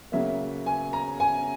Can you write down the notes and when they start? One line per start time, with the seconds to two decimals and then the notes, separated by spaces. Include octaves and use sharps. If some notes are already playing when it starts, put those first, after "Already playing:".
0.12 C#3 F#3 A#3 E5
0.66 G#5
0.93 A#5
1.20 G#5